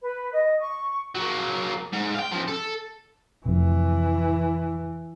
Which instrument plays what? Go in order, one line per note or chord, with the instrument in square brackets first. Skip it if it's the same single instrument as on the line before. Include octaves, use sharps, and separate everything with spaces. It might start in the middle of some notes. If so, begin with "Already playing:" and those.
[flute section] B4
D#5
C#6
[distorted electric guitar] F#3 A#3
G#2
F5 G5
C#3 F3
A4
[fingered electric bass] F2 C3 [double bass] E3